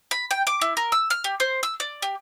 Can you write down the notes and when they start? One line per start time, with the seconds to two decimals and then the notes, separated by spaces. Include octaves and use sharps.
0.11 B5
0.31 G5
0.47 D6
0.61 E4
0.77 A#4
0.92 E6
1.10 F6
1.24 G4
1.40 C5
1.63 E6
1.80 D5
2.02 G4